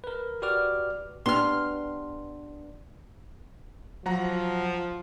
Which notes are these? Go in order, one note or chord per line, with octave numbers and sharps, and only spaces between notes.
A#4 B4
F#4 G4 B4 D5 D6 F6
B3 D4 G4 C6 F6
F3 F#3 F#5 A#5